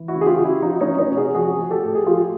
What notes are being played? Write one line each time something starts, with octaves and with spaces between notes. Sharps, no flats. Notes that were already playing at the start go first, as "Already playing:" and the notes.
Already playing: E3
E4 F#4
C#3
G#4
F4 G4
C#3
E4 F#4
F3 D#4 F4
C#4 D#4
F3
C#4 D#4
C3
F#4 G#4
F3 F#4 G#4
F3
G4 A4
A2
G#4
F3 F4 G4